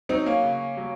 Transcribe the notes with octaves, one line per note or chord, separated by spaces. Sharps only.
F#3 C4 D#4
A#3 C#4
C#3
F#3